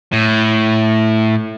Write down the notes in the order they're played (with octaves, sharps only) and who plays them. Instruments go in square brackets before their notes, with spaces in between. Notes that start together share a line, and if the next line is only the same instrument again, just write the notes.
[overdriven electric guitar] A2